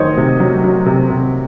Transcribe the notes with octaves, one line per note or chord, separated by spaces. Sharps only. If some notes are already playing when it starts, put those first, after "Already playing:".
Already playing: D#3 F#3 C5 C#5 D#5
C3
F#3
F#3
C3
C3